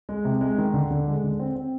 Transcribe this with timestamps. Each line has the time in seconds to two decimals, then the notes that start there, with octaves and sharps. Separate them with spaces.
0.09 G#3
0.25 C3
0.41 G#3
0.58 D#3
0.74 D3
0.91 D3
1.08 G#3
1.24 D3
1.40 C4
1.56 C4